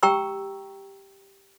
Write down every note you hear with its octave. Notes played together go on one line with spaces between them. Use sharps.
G4 G5 A#5 C#6 E6